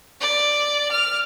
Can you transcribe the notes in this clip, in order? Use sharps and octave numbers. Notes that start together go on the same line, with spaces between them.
D5
F6